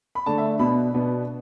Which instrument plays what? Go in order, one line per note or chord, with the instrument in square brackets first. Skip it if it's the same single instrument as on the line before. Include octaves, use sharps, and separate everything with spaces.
[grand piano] B5
D3 A3 D4 A5
E5
B2 B3 D4 B5
B2 B3 D4